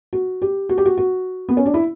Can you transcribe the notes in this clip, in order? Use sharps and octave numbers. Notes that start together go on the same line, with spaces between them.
F#4
G4
F#4
G4
F#4
F#4
B3
C#4
D4
E4